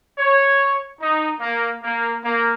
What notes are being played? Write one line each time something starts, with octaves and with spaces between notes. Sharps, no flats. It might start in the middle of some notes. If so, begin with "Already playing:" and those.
C#5
D#4
A#3
A#3
A#3